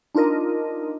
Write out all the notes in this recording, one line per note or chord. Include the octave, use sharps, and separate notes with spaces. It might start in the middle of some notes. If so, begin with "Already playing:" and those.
D4 D#4 F4 A#4 D#5